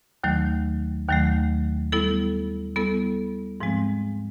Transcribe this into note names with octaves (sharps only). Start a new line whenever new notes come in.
D#2 D#3 F#3 A3
D#2 D#3 F#3 A3
G3 B3 E4 A4
G3 B3 E4 A4
G#2 F3 G#3 C4